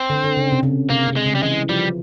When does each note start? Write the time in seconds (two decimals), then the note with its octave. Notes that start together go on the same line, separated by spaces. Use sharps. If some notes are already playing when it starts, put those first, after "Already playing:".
Already playing: C4
0.10 D3
0.24 D3
0.37 C#3
0.52 C3
0.63 C#3
0.90 C3 A#3
1.08 C3
1.16 G#3
1.25 C#3
1.35 G3
1.43 E3 G#3
1.69 F3 G3